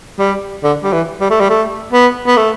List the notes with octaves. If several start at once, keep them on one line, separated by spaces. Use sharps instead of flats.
G3
D3
G3
E3
G3
A3
G3
A3
B3
B3
A3